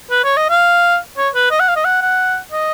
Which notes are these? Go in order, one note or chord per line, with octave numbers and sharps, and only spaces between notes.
B4
C#5
D#5
F5
C#5
B4
D#5
F#5
F5
D#5
F#5
F#5
D#5